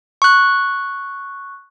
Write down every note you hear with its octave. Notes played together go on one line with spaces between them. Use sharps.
C#6 F#6